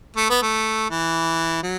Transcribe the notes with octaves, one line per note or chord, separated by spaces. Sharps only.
A3
B3
A3
E3
F#3